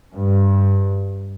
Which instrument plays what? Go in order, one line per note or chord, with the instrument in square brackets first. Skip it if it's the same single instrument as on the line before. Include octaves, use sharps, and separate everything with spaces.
[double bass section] G2